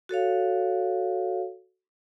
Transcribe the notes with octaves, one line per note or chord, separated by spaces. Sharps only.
F#4 A4 C#5 F5